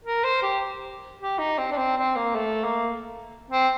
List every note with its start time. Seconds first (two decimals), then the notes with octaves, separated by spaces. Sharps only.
0.04 A#4
0.24 C5
0.43 G4
1.20 G4
1.39 D#4
1.58 C4
1.71 D4
1.77 C4
1.97 C4
2.16 A#3
2.35 A3
2.64 A#3
3.51 C4